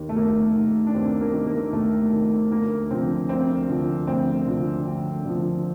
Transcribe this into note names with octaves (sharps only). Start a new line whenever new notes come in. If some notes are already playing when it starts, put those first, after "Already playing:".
Already playing: D#2 D#3
A3
D#2 A#3
D#3
D4
D#2 C4
A#3
D#3
A#3
D#2 A3
D#3
D2 A#3
D3 F3 C4
D2 C4
D3 F3
D2 C4
D3 F3
D2
D3 F3